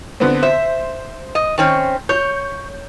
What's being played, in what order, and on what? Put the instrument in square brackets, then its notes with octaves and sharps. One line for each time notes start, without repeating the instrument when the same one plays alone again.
[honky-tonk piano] D3 B3 C4
[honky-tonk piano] C5 [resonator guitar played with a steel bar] E5
[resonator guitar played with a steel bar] D#5
D#3 C4 C#4
[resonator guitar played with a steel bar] C#5 [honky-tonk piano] G6